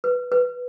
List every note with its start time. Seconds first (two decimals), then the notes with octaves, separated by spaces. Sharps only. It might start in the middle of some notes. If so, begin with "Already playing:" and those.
0.04 B4
0.32 B4